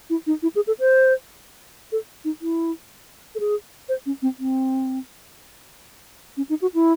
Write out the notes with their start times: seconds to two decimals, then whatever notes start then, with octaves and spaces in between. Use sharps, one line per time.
0.10 E4
0.27 D#4
0.43 E4
0.56 G#4
0.67 A4
0.80 C5
1.92 A4
2.25 D#4
2.42 E4
3.35 A4
3.40 G#4
3.89 C5
4.06 C#4
4.22 C4
4.39 C4
6.37 C#4
6.49 D#4
6.62 F#4
6.74 E4